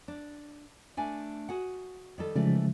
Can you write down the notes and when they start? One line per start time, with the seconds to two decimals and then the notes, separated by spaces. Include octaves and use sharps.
0.08 D4
0.97 A3 D4 G#5
1.49 F#4 G#4 F#5
2.18 D#3 G3 A4
2.36 C#3 E3 F3 G#3 A3 D5